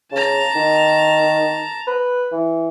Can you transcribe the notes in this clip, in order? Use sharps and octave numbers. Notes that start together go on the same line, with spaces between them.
C#3 A5 A#5
D#3
B4
E3